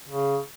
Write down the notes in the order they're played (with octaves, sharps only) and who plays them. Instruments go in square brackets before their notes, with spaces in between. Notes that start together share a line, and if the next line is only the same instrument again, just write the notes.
[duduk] C#3